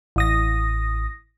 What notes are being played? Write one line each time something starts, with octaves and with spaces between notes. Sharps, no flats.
A1 D#6 A#6